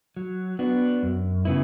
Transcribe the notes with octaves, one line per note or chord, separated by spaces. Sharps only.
F#3
B3 D4 F#4
F#2
C#3 F#3 B3 E4